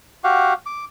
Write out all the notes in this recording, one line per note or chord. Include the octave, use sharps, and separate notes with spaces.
F#4 G4 F5 F#5
D6